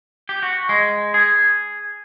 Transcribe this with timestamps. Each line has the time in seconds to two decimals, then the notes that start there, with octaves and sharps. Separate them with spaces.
0.29 G4
0.43 F#4
0.69 G#3
1.14 G#4